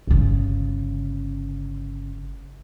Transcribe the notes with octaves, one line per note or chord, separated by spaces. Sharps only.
G1 C#3